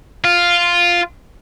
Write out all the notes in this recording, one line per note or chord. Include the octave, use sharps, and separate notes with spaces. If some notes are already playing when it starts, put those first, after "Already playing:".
F4